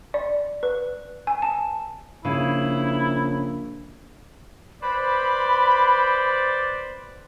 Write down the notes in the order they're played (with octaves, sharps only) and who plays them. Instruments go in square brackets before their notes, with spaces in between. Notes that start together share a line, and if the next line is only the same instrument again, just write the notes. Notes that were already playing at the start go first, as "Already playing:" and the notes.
[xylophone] D5
B4
G#5
A5
[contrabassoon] A#1 [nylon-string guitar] C#3 [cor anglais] E4
[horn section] B4 C5 [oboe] D5 [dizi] B5